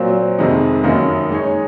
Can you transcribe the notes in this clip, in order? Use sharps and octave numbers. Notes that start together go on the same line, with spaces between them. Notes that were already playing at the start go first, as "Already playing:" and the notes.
Already playing: A#2 F#3 C4
F2 C3 D#3 G#3 D#4
F#2 D#3 A#3 D#4
G#3 D#4 G#4 C#5